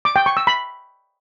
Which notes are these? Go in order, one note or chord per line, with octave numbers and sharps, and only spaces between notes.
D6
G5
C#6
E6
B5